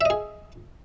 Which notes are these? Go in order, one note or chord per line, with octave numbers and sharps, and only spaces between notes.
G#4 D#5 E5